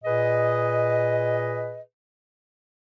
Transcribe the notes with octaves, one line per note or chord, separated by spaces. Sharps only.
A#2 G#4 B4 D#5